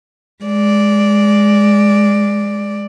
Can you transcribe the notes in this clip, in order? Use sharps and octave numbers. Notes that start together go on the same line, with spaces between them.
G#3 D5